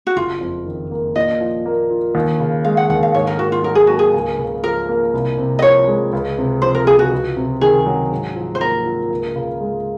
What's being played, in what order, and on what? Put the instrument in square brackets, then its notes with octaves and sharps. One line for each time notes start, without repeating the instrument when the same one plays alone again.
[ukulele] F#4
[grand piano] F#1 [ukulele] F4
[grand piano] F2
D#3
A#3
[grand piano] A#2 [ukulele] D#5
[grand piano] F3
A#3
F4
D#2
C#3
[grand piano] G#3 [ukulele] F5
[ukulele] F#5
[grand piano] D#2 [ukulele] F#5
[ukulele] F5
[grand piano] G#2 [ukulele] C#5
[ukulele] A#4
[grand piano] D#3 [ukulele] F#4
[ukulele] F4
[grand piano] F#3 [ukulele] A#4
[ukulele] G#4
[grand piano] A#3 [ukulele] F#4
[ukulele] G#4
[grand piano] C#2
C#3
[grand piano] F3 [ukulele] A#4
[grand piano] A#3
C2
C3
[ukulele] D#5
[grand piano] F3 [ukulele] C#5
[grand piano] G#3
C#2
C3
[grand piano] F3 [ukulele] C5
[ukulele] A#4
[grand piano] C#2 [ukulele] G#4
[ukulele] F#4
[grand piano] C#2
C3
[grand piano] D#3 [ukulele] G#4
[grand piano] F#3
G#2
F3
[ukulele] C5
[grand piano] A#3 [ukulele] A#4
[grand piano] F4
C#2
C#3
G#3